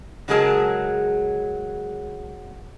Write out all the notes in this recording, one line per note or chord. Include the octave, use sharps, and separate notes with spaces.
C#3 F#3 G#3 G#4 A#4 A5